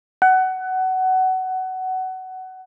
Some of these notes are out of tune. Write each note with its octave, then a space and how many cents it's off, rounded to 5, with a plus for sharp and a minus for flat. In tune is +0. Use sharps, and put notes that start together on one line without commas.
F#5 +20